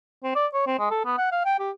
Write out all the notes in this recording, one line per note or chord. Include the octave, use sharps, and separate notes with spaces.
C4
D5
C#5
C4
G#3
A4
B3
F#5
F5
G5
G4